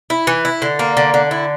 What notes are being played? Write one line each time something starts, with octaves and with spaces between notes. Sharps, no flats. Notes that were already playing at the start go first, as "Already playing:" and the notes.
E4
E3
E4
D3
A#3
D3
D3
E4